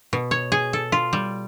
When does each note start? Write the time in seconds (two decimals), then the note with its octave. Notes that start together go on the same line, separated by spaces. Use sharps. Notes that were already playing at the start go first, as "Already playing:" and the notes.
0.13 B2
0.31 C#5
0.52 G#4
0.73 A4
0.92 F4
1.13 G3